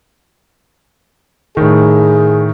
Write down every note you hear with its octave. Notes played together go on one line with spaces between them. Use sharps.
A2 D#3 G#4